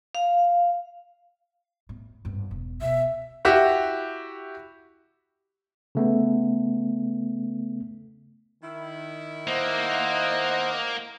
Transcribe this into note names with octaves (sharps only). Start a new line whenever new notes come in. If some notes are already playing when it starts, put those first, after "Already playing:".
F5
A2
G#1 G2
E1
B2 E5
E4 F#4 G4
C#3 A3 B3
D#3 E4
A#3 C5 D#5 F#5